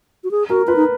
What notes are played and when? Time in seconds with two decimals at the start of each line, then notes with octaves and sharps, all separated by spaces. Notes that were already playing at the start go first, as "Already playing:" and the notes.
0.24 F#4
0.31 G#4
0.50 F#4 A#4
0.67 F4 B4
0.76 D#4